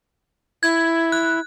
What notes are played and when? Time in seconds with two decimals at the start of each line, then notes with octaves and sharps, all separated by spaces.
0.63 E4 G#6
1.12 F#6